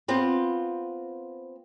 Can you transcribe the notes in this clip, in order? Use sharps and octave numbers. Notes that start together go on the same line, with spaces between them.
B3 C4 F4